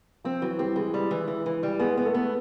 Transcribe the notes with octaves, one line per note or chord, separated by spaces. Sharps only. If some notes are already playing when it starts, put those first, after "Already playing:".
F3 C4 F4
E3 F#3 F#4
G3 C4 G4
E3 G#3 G#4
G3
E3
E3
E3
G3
G#3 B3 G#4
B3
A3 A4
B3